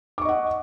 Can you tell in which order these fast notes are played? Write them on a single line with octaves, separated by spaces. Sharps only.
D6 C#6 D#5 F#5